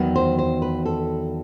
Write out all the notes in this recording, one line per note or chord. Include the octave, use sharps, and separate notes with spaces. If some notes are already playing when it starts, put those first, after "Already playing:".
Already playing: E2 D#3 F#3 B3
C5
C5
B4
A4